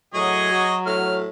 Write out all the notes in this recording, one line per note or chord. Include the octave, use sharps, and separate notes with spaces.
A2 F#3 G#4 C#5 D#5
F#4
A2 F6